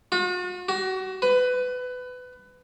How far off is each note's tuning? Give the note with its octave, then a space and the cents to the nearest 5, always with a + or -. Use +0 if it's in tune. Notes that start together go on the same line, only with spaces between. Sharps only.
F#4 -45
F#4 +30
B4 +20